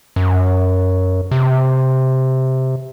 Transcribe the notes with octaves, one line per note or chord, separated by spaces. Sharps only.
F#2
C3